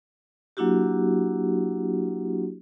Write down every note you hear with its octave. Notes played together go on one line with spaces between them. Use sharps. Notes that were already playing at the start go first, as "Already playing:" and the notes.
F#3 A#3 D4 E4 F#4 G4